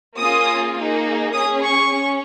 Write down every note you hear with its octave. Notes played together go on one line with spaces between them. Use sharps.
A#3 C#4 F4 G#4 D#6
A#3 D#4 G#4
C#4 G#4 D#6
C#6
C#4